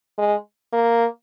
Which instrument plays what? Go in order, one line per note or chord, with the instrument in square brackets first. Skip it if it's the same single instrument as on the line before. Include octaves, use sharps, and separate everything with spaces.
[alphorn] G#3
A#3